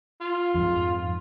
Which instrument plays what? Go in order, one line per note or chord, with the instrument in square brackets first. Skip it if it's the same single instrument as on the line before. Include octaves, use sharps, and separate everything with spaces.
[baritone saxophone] F4
[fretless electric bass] F2 G#2